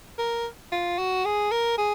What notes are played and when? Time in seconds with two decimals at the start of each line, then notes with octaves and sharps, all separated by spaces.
0.18 A#4
0.72 F4
0.98 F#4
1.25 G#4
1.51 A#4
1.78 G#4